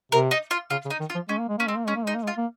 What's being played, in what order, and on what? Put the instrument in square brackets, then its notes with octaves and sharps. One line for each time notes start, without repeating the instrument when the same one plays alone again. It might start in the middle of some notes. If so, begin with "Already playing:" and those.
[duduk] C3 [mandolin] A#4
[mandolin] D#4
F4
[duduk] C#3 [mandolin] F4
[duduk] C#3
[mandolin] D#4
[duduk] D#3
[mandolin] F4
[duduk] F3
[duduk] G#3 [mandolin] C#4
[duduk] A#3
G#3
[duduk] A#3 [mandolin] C#4
[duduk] G#3 [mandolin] C4
[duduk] A#3
[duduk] G#3 [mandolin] C#4
[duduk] A#3
[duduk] G#3 [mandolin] D#4
[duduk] A#3
G#3
[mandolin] F4
[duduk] A#3